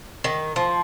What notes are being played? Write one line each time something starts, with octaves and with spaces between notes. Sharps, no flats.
D#3
F3